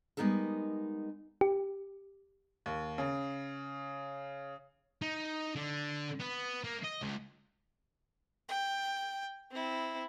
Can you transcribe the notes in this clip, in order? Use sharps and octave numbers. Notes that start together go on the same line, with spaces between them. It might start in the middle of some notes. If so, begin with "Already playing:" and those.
G3 G#3 B3 D#4 A4 A#4
G4
D#2
C#3
D#4
D3
B3
A#3
D#5
C#2
G5
C4 E4